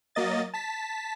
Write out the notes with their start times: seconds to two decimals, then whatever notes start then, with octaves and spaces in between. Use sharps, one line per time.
0.15 F#3 A#3 D#5 A6
0.54 A5 B6